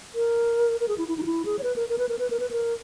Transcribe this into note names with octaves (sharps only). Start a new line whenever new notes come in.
A#4
A#4
G#4
E4
E4
D#4
F#4
E4
G#4
C#5
B4
A#4
A#4
B4
A#4
B4
A#4
B4
A#4